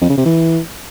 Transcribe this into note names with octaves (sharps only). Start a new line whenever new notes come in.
F2
C#3
C3
E3